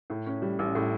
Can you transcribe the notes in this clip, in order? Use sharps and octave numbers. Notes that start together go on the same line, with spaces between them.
A2
C#4
G3
A1
A2